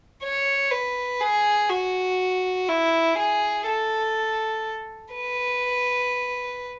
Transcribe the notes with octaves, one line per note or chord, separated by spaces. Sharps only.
C#5
B4
G#4
F#4
E4
G#4
A4
B4